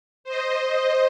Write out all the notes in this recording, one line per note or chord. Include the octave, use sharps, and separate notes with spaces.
C5 D#5